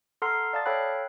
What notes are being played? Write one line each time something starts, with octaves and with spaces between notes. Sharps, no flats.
A4 F#5 A#5 C6 F6 C7
D5 F5 A5 D#6 A6
A4 C#5 F5 G5 B5 F#6